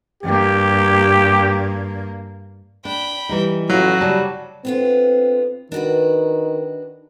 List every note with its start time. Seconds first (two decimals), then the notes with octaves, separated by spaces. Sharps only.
0.23 G2 A#3 G4
2.85 D4 G5 B5
3.29 E3 G3 D#4
3.70 A1 F#3 F4 F#4
4.01 C#3 G3 A5
4.65 D3 B3 C4 F4
5.72 D#3 D4 F#4 B4